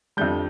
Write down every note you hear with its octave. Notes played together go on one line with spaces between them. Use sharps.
F2 D3 G3 G6